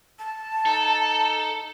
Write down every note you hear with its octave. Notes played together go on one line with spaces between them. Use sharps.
A5
D#4 A4